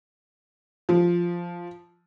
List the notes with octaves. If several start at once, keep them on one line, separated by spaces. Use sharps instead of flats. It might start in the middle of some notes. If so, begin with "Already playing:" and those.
F3